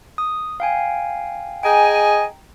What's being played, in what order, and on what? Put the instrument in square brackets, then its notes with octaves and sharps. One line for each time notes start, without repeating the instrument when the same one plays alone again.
[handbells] D#6
F5 G5 G#5
[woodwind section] G#4 D#5 G#5 [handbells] G5 A#5 G6